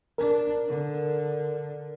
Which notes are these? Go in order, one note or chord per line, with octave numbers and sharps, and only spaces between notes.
D4 A#4
D3